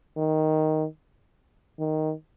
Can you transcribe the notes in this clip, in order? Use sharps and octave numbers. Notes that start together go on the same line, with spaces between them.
D#3
D#3